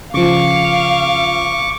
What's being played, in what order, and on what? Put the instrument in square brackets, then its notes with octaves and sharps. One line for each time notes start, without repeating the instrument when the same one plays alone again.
[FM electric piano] C#3 F3 [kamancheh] F5 [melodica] C#6 D6